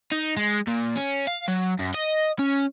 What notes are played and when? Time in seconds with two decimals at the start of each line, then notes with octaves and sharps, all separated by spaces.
0.12 D#4
0.37 G#3
0.67 A#2
0.96 C#4
1.27 F5
1.48 F#3
1.79 F#2
1.95 D#5
2.39 C#4